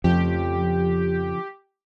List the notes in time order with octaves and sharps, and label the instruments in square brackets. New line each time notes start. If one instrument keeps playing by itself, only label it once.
[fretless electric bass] F2 [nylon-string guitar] C#3 F3 A3 [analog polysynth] G4